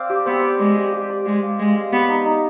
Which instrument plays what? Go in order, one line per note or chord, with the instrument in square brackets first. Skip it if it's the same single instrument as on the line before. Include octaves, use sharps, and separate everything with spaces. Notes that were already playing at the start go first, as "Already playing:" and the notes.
Already playing: [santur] C4 D5 F5
G4
[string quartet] B3 [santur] C4
[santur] D5
[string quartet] G#3 [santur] D5
[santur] G4
G4
D5
[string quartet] G#3 [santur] G4
[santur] F5
[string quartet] G#3 [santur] F5
[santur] F5
[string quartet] B3 [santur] G4
[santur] D#4
D#4